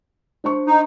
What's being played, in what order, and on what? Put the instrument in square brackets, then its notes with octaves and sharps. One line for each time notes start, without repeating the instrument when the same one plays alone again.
[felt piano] D4 C5 C#6
[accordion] D#4